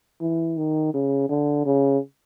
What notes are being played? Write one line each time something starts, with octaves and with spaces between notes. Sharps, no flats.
E3
D#3
C#3
D3
C#3